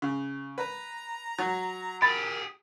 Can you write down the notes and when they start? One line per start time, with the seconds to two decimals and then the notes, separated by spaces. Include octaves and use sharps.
0.02 C#3
0.58 B4 A#5
1.39 F#3
2.02 G4 G#4 A#4 B5 A6